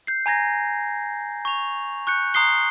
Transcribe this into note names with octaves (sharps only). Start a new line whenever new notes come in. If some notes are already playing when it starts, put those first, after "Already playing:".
G6 C7
G#5 A#5 G#6 A#6
C#6 F7
C#6 F#6 G6 C#7
A#5 C6 D#6 F#6 C7 G7